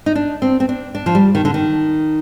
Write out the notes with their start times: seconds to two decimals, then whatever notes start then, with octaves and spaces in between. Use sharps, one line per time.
0.06 D#4
0.15 D4
0.42 C4
0.60 C4
0.69 D4
0.95 D4
1.06 F3
1.15 G3
1.35 D#3
1.45 D3
1.54 D#3